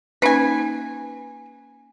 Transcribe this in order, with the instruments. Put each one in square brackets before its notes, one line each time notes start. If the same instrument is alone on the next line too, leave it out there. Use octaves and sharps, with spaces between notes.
[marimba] A#3 C#4 D#4 [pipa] B4 G#5